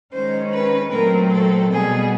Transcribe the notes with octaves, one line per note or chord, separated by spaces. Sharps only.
D#3 G#3 C#4 C5
B4
A#2 F#3 A3 C4 A#4
A4
B2 G3 B3 G#4